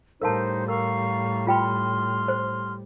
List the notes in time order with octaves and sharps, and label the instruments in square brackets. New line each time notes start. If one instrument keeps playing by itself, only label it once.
[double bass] A2 G3 [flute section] D#4 C5 [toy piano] A#4 F5 A5
[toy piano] A#4 [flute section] F5 A#5 C#6
[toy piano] F4 G5 B5 [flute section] C6 F6
[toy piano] C5